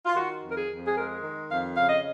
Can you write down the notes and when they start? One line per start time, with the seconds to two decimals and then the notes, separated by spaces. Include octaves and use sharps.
0.06 F4
0.16 D#3 F#4
0.43 F2
0.50 A#4
0.56 G#4
0.69 F2
0.87 G#4
0.96 G#3 A#4
1.23 D#3
1.49 F2 F5
1.76 C#3 F5
1.88 D#5